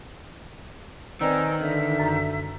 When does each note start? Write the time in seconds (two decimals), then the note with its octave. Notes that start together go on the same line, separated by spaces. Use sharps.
1.21 D#3 C4 B4 D5 D#5 G#5 A#5 E6
1.61 D3 E5
2.00 F#2 A#5